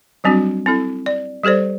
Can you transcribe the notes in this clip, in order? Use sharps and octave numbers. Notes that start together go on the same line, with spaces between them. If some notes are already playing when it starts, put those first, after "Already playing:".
F#3 G3 C4 D4 F#4
C4 E4 A4
D5
G3 G4 A4 C5 D5